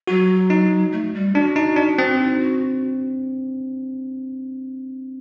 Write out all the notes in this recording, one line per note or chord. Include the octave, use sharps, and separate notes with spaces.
F#3 F#4
D#4
A3
G3
D4 F#4
D#4
D4
C4
D#4
F#4